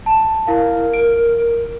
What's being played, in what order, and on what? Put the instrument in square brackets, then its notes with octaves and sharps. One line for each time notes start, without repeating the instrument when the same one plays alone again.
[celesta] A5
[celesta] E4 F5 [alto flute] A#4
[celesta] D7